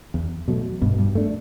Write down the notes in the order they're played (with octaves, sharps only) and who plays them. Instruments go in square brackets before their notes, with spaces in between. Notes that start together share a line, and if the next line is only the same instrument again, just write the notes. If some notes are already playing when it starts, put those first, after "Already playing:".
[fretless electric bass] E2
B2 F#3 A3
[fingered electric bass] G2 [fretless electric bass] B2
[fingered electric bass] G2
[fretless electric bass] A3 D4